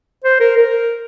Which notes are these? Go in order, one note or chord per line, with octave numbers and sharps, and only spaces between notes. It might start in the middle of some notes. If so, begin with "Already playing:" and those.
C5
A#4
A#4